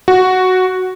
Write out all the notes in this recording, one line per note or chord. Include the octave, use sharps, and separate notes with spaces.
F#4